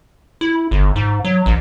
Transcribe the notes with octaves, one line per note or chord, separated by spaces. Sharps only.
E4
G1
G#2
F#3
A1